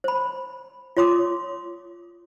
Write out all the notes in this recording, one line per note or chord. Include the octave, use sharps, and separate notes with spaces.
C5 B5
F4 C#5 C6 D6 D#6